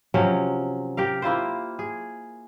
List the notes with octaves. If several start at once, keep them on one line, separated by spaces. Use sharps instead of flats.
C3 F3 F#3 C#4
G4 A#4 F5
A#3 E4 F4 C5
G#4